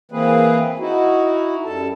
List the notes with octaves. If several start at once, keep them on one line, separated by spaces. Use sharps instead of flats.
E3 A#3 C4 G#4 B4
D#4 E4 F#4
F#2 G3 A4 A5